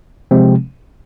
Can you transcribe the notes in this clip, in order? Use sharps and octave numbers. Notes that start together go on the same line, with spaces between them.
C3 F3 G#3 C4